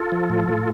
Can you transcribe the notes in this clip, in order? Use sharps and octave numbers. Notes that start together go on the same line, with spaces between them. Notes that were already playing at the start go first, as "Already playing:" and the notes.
Already playing: F4 A4
F3
A2
A2